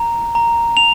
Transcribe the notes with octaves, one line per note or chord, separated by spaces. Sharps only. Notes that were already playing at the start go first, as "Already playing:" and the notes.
Already playing: A#5
A#5
F7